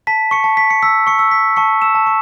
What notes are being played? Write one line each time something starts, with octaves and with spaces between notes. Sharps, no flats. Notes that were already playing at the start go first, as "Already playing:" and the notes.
A5 B6
C#6 C#7
A5
B6
C#7
E6 B6
C#6 C#7
E6
B6
A5 C#6 C#7
E6 E7
A5
C#6